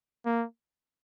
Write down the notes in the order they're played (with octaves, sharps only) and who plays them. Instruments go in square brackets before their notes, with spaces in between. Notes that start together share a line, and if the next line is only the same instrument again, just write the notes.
[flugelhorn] A#3